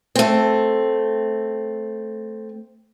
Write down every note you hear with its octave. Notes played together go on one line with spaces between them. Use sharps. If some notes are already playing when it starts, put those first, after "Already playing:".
A3 C4